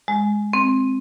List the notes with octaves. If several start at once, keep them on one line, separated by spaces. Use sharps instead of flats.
G#3
C4